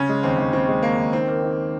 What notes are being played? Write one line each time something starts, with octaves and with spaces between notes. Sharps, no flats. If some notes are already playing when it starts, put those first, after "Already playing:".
Already playing: C#3 C#4
G#3
D#2 C4
D#2
C#3 C4
G#3
D#2 A#3
D#2
D#3 C4
A#3
D#4